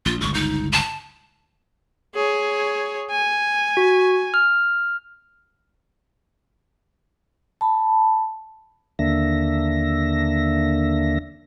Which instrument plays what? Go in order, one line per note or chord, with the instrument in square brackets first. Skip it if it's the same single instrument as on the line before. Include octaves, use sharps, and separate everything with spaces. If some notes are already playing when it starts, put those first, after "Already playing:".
[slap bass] A#1 [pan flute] F4
[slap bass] G1 C#2 [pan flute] C#6
[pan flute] D#4
A5
[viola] G#4 C#5
G#5
[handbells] F#4
F6
[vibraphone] A5 B5
[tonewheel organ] D#2 D3 A#3 D4 E5 A#6